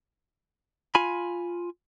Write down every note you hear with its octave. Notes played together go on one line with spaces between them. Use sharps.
F4 G#5 B5